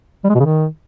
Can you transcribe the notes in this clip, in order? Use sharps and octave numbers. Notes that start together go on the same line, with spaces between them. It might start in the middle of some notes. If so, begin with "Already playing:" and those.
G3
G#3
B2
C#3
D#3